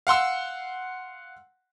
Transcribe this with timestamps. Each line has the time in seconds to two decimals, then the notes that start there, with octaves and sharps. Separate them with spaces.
0.07 F5 F#5 C6 E6